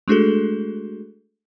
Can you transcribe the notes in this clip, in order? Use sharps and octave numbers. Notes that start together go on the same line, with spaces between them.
G#3 A3 D4 F#4 G#4 A4